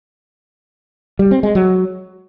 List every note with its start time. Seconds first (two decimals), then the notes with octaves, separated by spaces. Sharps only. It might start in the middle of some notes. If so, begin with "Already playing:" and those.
1.19 G3
1.31 C4
1.43 G#3
1.55 F#3